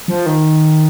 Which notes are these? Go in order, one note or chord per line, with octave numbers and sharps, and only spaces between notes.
F3
D#3